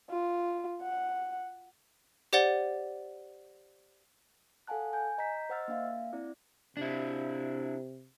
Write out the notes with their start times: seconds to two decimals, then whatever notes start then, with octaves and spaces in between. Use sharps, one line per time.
0.10 F4
0.82 F#5
2.33 G4 C5 D5 F#5 A6 G7
4.67 A4 F5 F#5 G#5 A5 F#6
4.93 G#5 G6
5.18 D#5 A#5 G6 B6
5.50 C5 D#5 F#5 E6 F6 A6
5.68 A#3 D4 E5 F5
6.13 C4 E4 D5
6.77 C3 D4 E4